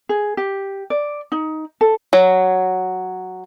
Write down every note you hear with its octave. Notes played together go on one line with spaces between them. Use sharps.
G#4
G4
D5
D#4
A4
F#3